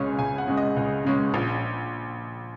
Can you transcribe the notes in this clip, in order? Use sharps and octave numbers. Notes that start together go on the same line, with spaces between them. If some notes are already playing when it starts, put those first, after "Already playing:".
Already playing: C#2 C#3 G#3 C#4 G#5
C#2 G#5
F#5
C#3 G#3 C#4
D#5
C#2
C#3 G#3 C#4
A#1